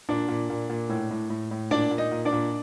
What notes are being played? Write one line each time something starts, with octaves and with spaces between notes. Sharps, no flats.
A#2 D4 D5
A#2
A#2
A#2
A2
A2
A2
A2
A#2 D4 D5
A#2
D#4 D#5
A#2
D4 D5
A#2